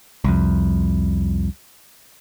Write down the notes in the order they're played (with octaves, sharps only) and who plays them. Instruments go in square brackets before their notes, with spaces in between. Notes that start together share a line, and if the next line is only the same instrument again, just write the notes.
[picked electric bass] C2 F2